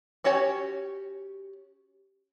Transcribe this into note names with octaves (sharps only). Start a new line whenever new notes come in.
C#4 F#4 G4 C#5 G#5